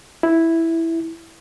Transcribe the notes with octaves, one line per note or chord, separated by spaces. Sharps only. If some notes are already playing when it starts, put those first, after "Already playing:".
E4